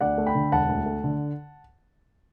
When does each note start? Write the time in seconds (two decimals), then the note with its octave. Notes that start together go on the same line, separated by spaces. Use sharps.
0.01 D2 D5 F#5
0.18 A3
0.27 G5 B5
0.35 D3
0.52 E1 F#5 A5
0.69 D2
0.86 A3
1.04 D3